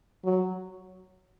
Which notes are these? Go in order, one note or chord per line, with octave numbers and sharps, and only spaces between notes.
F#3